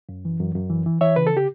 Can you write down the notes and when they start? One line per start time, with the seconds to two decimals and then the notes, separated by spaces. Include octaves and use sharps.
0.09 F#2
0.25 E3
0.40 F#2
0.55 F#2
0.70 E3
0.86 E3
1.01 E3 C#5 E5
1.16 C#3 B4
1.27 A4
1.37 G4